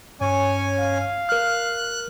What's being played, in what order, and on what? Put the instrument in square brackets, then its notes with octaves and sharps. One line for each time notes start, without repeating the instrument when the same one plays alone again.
[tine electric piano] G2 [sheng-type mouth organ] C#4 G#5 [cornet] C#5
[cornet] F5
[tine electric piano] A#4 F6 [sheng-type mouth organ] F#6